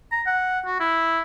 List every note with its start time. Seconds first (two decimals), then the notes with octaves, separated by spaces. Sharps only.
0.12 A#5
0.26 F#5
0.66 F#4
0.80 E4